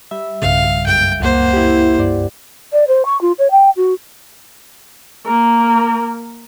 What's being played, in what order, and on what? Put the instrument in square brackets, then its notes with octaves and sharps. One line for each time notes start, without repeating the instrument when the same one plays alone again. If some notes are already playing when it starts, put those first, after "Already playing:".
[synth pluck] G3 E5
[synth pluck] B1 G2 C#3 [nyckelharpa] F5
[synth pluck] F#2 [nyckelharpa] G5
[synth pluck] C#2 F#5 [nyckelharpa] A#3 C5
[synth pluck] E4 G4
G2 D5
[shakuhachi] D5
C5
C#6
F4
C#5
G5
F#4
[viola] A#3 A#4